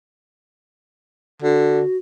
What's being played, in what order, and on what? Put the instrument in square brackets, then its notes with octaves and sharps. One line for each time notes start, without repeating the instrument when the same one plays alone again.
[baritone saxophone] D3 [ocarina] F#4